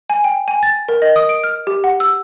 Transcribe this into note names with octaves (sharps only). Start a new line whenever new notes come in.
G#5
G5
G#5
A6
A#4
D#5
D#6
D7
F6
G4
F#5
E6